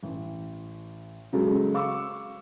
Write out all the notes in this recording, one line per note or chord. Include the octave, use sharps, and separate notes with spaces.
A1
C#3 F#3 G#3 A4
F5 C#6 D6 E6